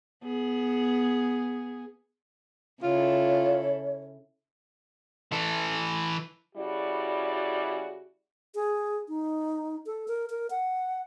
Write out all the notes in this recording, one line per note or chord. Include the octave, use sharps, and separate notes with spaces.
B3 G#4
C#3 E4 F4 A4 C#5
E3 A4
C#3 G3 E4 F#4 D5
G#4
D#4
A4
A#4
A#4
F#5